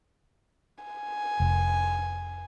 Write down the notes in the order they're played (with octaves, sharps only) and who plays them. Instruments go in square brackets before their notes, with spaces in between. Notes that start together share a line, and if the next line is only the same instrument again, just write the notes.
[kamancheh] G#5
[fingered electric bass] F1